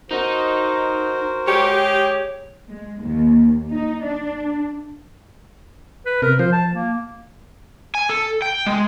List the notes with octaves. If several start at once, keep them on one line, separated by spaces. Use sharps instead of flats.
D#4 F#4 A#4 C5
G#3 G4 C#5
G#3
D#2
D#4
D4
B4
C3 A#4
F3 C5
A5
A#3
G#5
A4
G5
G#3